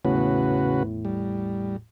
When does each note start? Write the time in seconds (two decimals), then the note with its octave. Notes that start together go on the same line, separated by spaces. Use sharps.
0.05 G#1 E2 A2 C#3 F#4 B4
1.05 G3